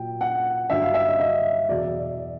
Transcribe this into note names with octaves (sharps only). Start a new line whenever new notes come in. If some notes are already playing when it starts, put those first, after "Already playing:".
Already playing: A#2 F#3 G5
F#5
G2 D3 F#3 E5
F5
E5
D#5
D#5
E2 B2 F#3 D5